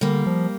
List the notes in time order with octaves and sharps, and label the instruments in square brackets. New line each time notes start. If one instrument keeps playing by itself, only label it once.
[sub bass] D3 [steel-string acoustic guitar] G3 A#3
[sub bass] F3